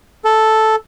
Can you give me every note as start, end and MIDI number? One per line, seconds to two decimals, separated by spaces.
0.24 0.76 69